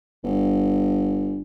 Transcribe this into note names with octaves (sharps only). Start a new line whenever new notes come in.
G1